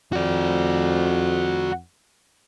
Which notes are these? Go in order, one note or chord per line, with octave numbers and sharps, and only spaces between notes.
F2 F#4 D5